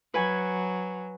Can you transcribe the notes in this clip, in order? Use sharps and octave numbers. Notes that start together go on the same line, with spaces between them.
F#3 B4 G#5